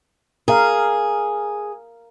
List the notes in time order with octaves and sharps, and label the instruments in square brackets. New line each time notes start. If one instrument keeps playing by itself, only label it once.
[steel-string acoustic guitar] G#4 [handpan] A#4 F5